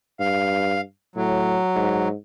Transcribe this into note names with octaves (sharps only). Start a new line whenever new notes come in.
G2 F5
A2 F#3
G#2